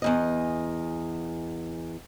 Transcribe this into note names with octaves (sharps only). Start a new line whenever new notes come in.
E2 D#3 D#5